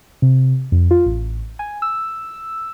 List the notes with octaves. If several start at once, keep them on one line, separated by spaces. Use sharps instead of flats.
C3
F2
F4
A1
G#5
E6